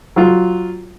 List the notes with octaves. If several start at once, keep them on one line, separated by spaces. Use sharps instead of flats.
F#3 F4